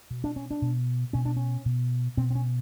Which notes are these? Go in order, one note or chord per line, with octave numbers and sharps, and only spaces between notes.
B2
D4
C#4
D4
B2
B2 C#4
D4
C#4
B2
B2 C4
C4
C#4